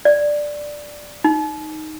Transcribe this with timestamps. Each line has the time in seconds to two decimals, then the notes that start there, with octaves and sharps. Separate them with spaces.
0.05 D5
1.24 D#4